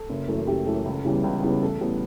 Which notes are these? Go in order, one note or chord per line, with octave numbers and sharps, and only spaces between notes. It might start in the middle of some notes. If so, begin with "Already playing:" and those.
Already playing: A4
F#1
F#2 E3 A3
F#1 G4
F#2 E3 A3 A4
C#2
C#3 E3 G3 B3
C#2
C#3 E3 G3 B3
A1 A4
A2 G3 B3